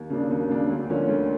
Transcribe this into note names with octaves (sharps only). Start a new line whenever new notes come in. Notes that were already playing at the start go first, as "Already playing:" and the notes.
Already playing: D#2
C#3 F#3 A#3 D4
D#2
C#3 F#3 A#3 D4
D2
D3 F3 A#3 C#4
D2